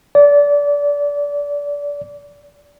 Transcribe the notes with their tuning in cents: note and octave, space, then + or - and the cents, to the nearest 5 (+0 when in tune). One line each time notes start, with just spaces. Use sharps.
D5 -25